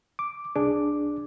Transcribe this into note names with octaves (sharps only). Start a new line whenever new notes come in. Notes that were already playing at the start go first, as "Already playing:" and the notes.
D6
C2 D4 G#4 D6